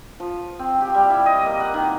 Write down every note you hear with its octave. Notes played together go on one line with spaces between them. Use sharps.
F3
C4
G4
G3
E4
D#5
A#3
F#5
D#3